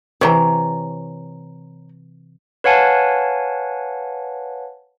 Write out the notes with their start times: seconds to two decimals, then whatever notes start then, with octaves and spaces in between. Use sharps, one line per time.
0.21 C3 E3 C#5 A#5
2.64 B4 C#5 F5 F#5 G#5 A5